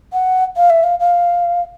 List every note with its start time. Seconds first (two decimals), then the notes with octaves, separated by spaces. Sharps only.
0.13 F#5
0.57 F5
0.70 E5
0.84 F5
1.00 F5